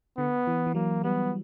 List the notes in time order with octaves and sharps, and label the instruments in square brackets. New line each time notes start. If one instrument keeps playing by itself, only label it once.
[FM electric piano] D3 [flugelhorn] B3
[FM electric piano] E3
E3
[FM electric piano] F#3 [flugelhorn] A#3
[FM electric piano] G3 [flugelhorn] B3